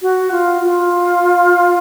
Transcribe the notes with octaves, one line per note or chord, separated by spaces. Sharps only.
F#4
F4
F4